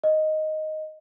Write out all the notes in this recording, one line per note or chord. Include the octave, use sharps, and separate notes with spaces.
D#5